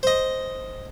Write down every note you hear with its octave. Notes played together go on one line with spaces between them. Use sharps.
C5 D#5